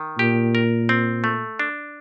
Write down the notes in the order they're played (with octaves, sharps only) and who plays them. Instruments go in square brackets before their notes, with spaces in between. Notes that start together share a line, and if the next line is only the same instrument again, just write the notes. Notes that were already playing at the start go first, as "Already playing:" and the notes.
Already playing: [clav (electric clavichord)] D#3
[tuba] A#2 [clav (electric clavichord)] G4
[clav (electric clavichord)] A#4
C4
A3
D4